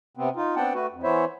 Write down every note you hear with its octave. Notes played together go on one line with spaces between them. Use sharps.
C3 B3 C4
D#4 F4
B3 C4 D4 F#5 G5 A5
A3 F#4 B4
F2
E3 B3 E4 C5 C#5 E5